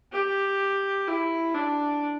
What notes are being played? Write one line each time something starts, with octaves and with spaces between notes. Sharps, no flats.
G4
E4
D4